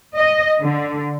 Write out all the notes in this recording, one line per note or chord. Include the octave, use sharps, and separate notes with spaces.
D#5
D3